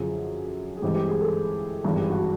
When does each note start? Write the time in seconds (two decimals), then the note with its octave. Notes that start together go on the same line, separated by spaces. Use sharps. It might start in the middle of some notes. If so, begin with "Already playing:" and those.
Already playing: F#2 D3 F3 G#4
0.77 G#4
0.82 G2 E3 G#3 C4 G4
0.95 G4
1.08 G#4
1.21 A4
1.84 G#1 G2 E3 G#4
1.96 G4
2.10 F#4